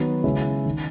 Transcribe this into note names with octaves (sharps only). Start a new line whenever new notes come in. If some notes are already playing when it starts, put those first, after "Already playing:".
Already playing: D#3 F#3 B3
C#3 G#3 C#4 E4
D#3